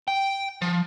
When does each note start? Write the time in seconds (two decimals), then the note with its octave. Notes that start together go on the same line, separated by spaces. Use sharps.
0.08 G5
0.62 F3